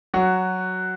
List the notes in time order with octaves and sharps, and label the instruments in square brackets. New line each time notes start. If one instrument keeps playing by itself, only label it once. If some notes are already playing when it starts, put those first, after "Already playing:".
[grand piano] F#3 F#4